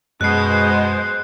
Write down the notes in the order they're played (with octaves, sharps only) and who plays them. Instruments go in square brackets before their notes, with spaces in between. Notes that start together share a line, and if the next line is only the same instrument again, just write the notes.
[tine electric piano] F#2 [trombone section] B2 [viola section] G#3 C5 [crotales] F#6 C7